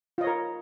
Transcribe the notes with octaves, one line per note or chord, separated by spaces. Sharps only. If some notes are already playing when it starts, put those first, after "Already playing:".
F4 A#4 C#5 D#5